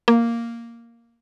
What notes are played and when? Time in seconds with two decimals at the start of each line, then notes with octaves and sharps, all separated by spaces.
0.08 A#3